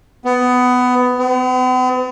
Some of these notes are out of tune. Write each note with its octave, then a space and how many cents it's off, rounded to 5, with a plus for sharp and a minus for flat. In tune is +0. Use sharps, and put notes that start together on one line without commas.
B3 +15
B3 +45